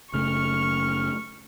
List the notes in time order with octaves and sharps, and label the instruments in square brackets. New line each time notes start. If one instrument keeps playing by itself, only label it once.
[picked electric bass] F#1 C#3 A3 [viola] C#6 [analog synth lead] F6